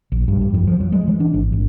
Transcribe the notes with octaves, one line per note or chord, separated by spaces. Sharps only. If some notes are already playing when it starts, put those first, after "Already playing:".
A#1
G2
G2
F2
F3
F#3
G#3
E3
D4
G#1
G#1